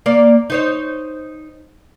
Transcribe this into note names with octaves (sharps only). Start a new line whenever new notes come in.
A#3 D5
D#4 C5 C#5